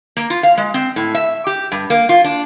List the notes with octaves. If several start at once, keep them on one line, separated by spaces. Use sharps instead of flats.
A#3
F4
F5
G#3
C4
A2
E5
G4
G2
A#3
F4
D4